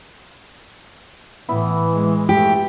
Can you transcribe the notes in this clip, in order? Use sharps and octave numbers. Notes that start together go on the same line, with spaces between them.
A2 E3 B3 E4
G#3
A3 G4